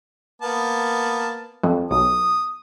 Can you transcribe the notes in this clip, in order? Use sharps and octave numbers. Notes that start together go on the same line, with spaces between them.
A#3 B3 A5
F2
B1 D#6